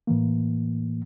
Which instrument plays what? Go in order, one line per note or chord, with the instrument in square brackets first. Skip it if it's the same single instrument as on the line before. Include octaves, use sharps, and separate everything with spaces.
[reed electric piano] A2 E3 A#3